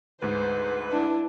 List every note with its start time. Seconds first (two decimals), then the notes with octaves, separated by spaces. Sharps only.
0.22 D2 G#2 G#3 B4 C5
0.92 D4 E4